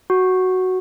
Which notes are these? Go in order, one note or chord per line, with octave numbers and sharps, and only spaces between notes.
F#4